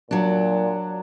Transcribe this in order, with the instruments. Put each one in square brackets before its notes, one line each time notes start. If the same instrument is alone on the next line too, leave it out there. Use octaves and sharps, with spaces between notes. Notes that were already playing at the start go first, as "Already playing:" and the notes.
[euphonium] A#2 [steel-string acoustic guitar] F#3 D4